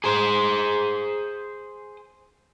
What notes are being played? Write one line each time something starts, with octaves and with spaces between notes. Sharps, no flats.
G#4 C5